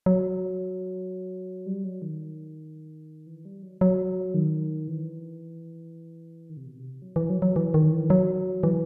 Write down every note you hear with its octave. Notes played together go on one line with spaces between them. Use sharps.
F#3
G3
F#3
D#3
E3
G3
F#3
F#3
D#3
E3
D#3
C3
B2
C3
F#3
E3
F#3
F#3
E3
D#3
E3
F#3
E3